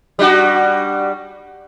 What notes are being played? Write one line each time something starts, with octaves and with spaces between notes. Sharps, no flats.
G3 D4 F#4